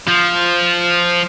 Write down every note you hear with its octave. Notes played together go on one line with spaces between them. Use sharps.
F3